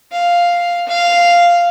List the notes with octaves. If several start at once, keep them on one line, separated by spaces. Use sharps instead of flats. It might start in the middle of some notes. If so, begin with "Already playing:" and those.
F5
F5